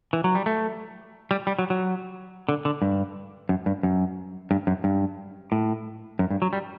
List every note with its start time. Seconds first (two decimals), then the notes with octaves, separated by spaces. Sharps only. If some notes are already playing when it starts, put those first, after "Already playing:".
0.13 E3
0.24 F#3
0.35 G3
0.46 A3
1.31 G3
1.47 G3
1.59 F#3
1.70 F#3
2.49 D3
2.65 D3
2.82 G2
3.49 F#2
3.66 G2
3.83 F#2
4.51 G2
4.67 F#2
4.84 G2
5.52 A2
6.19 F#2
6.30 G2
6.42 F#3
6.53 G3